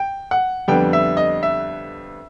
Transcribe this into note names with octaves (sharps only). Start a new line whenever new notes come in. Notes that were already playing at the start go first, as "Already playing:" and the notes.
Already playing: G5
F#5
F2 D3 G3 B3 G5
E5
D#5
E5